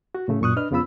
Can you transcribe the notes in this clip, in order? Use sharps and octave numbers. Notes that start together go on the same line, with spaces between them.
F#4
A2 C#3 A3
F#2 A#2 C#6 D#6 F#6
D4 B4 D#5 F6
F2 C#3 B3 F4 B5 E6